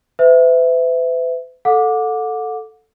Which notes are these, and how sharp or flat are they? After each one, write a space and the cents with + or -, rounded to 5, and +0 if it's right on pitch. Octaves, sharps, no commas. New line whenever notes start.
B4 +45 E5 +0
A4 +0 F#5 -35 D6 +0